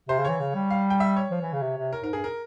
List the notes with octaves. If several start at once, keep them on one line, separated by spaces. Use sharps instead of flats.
C3 C5
C#3
E3 C#5
C#3
G3
F5
G5
E5
C#5
F3
E3
C#3
C3
C3
A#4
G#2 A#4
G2 G#4
A#4